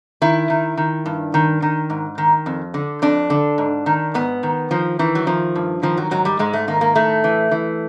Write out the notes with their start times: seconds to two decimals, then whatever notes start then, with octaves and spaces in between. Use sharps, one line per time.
0.22 D#3 E4
0.50 D#3
0.77 D#3
1.06 G2
1.34 D#3
1.62 D#3
1.90 G#2
2.18 D#3
2.46 F2
2.74 D3
3.02 F2 D4
3.30 D3
3.58 G#2
3.86 D#3
4.14 G#2 B3
4.43 D#3
4.71 D#3 F3
4.99 D#3 E3
5.15 F#3
5.27 D#3 F3
5.55 G2
5.83 D#3 F3
5.97 F#3
6.11 G#2 F#3
6.25 G3
6.39 G#2 G#3
6.53 A3
6.68 D#3 A#3
6.81 A#3
6.95 A2 A3
7.24 E3
7.51 E3